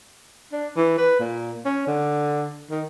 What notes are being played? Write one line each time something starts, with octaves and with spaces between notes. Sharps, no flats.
D4
E3
B4
A#2
C#4
D3
D#3